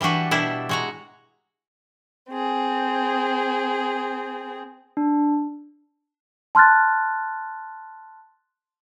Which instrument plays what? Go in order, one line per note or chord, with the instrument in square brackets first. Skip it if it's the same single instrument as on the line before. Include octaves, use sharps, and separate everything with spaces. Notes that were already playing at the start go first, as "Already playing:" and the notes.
[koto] E3 G3 D4 F#4 B4
B2 G3 D4 E4
G#3 F#4 A#5
[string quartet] C4 G#4
[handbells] D4
[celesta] A5 C6 F6 F#6 A6